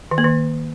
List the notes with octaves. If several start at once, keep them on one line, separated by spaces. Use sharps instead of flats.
D#3
A#3
D#3